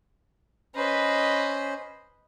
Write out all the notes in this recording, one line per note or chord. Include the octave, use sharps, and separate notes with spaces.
C#4 B4 C5 D#5